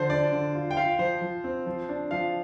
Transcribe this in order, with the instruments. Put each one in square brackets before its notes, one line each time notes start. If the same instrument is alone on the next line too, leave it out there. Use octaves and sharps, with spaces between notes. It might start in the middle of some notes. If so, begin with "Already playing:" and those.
Already playing: [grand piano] D3 F3 C5
D4 D5
D3
F4
G5
F4 F5
F3 C5
F3
C4
F3
D4
F3 F5